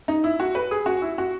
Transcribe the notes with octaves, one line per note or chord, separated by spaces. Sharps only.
D#4
E4
F#4
B4
G#4
F#4
E4
F#4